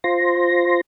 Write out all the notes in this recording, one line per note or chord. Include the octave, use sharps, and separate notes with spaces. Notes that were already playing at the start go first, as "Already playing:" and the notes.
F4 C5 C6 A#6